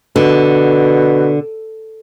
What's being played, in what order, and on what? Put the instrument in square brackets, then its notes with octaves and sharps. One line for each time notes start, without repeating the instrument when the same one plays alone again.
[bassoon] B2 [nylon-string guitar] D3